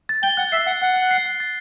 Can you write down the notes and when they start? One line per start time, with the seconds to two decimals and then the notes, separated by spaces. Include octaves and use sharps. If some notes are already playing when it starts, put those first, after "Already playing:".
0.09 A6
0.23 G5 G7
0.37 F#5 F#6
0.52 E5 C7
0.66 F#5 F#6
0.82 F#5 F#6
0.96 G7
1.11 C7
1.26 F#6
1.40 A6